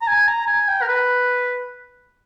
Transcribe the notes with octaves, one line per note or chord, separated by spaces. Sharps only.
A#5
G#5
A#5
G#5
G5
A#4
B4